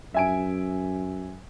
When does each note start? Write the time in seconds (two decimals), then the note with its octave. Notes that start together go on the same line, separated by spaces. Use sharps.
0.14 F#2 E5 G#5 D7